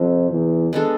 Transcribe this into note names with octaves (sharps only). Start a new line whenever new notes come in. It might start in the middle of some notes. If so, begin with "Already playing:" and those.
Already playing: F2 C3
E2
G#3 B3 D4 A4